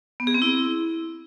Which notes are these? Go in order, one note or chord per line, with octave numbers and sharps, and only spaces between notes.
B3
G#4
C4
E4